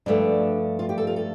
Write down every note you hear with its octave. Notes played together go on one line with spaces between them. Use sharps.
G2 F3 A3 D4
F4
G4
A4
F4
A4